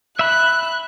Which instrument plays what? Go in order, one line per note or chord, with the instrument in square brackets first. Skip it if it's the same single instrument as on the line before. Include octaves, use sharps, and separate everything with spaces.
[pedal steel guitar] E5 B5 [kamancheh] F#6